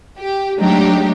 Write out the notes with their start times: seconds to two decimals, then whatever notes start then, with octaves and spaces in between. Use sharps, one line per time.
0.19 G4
0.58 F#3 G#3 A3 D4 D#4 G4